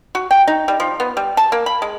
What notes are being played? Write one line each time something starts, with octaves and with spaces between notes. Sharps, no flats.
F#4
G5
D#4
G3
F3
B3
G3
A5
A#3
B5
G#3